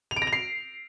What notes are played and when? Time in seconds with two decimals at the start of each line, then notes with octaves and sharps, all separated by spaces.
0.11 F7
0.16 D7
0.22 A#6
0.27 F7
0.33 C7